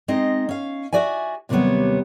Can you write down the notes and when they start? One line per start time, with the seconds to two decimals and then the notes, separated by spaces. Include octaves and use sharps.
0.08 G#3 C4 D#4 D#5
0.49 C#4 F5
0.93 F#4 D5 E5 G#5
1.49 D#2 C3 F#3 G3 B3 C#5